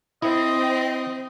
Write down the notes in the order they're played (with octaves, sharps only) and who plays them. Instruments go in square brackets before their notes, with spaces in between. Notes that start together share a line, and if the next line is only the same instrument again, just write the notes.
[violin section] C4 [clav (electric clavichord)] E4 [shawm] D#5